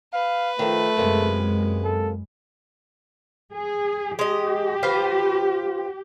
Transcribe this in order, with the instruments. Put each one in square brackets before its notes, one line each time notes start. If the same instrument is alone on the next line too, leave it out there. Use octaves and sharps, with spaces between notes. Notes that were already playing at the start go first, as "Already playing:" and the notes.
[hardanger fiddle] B4 [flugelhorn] F5
[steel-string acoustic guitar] D#3 F3 [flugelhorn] A3
[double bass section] F#2 G#3 [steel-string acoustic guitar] C3 A#3
[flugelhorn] A4
[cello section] G#4
[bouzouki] G#3 D#5 [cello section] G4
[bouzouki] F4 B4 C5